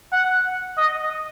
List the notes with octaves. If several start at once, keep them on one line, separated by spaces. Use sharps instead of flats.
F#5
D#5